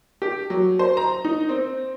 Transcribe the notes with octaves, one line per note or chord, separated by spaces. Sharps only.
G4
F#3
C5
A#5
D#4
C4